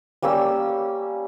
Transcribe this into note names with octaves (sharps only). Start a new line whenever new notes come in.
G3 A#3 C#4 E6